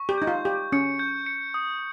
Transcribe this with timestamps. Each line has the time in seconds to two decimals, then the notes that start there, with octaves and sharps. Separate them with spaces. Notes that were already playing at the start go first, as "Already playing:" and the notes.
Already playing: C#6
0.09 G4
0.18 D#4 G6
0.27 F4
0.45 G4 G6
0.72 C#4 C#7
0.99 G6
1.26 C#7
1.54 D#6